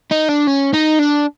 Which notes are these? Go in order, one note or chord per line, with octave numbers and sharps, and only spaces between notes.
D#4
D4
C#4
D#4
D4